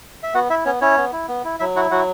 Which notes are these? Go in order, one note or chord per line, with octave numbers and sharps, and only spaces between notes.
E5
B3 F#4 F#5
E4 E5
B3 C#4 C#5
C#4 E4 C#5
B3
E4
B3
E4
F#3 E4 E5
E4 F#4 F#5
F#3 F#4 F#5